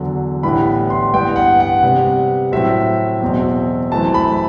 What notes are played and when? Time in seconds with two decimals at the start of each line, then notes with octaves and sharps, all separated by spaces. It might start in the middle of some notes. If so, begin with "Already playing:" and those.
Already playing: E2 D3 F#3
0.43 A2 E3 G3 B3 D4 B5
0.90 C6
1.14 G2 E3 B3 G5
1.36 F#5
1.60 F#5
1.83 C3 G3 B3
2.52 A2 F#3 C4 E5
3.21 E2 B2 F#3 C4
3.91 F#2 E3 A3 C4 A5
4.14 B5